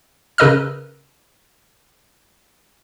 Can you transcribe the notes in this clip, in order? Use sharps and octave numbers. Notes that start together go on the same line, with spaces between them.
C#3 A#4 B4 D#5 E6 F6